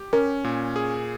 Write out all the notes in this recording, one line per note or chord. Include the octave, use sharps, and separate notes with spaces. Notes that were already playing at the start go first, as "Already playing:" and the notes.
Already playing: G4
C#4 A#4
A#2
G#4